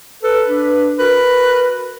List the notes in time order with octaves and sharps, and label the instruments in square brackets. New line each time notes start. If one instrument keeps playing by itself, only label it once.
[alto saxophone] A4 [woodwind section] B4
[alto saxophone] D4
[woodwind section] F#4 A#4 [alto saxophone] B4